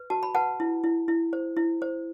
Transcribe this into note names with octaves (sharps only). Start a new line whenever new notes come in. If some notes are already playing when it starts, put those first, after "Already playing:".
Already playing: B4
F#4 A5
B5
B4 F#5 A5
E4
E4
E4
C5
E4
C5